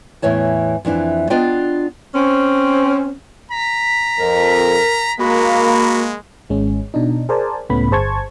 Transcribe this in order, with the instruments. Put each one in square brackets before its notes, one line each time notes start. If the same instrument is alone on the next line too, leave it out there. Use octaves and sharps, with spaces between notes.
[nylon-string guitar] E2 A2 E3 C#5 A5
F2 E3 D4 E4
B3 D4 F4 D5 D#5 G5
[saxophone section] C4 C#4
[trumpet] A#5 [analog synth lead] B6
[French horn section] F2 [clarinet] A#4
[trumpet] G#3 [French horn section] A#3 [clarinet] F#4 [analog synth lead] B5
[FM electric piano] G#1 G#3 C#4
B2 D4 D#4
G#4 A#4 C5 D5 G#5 A5
C#2 A2 A3 B3 C#4 B5
G1 G#4 C5 A5 C#6 G#6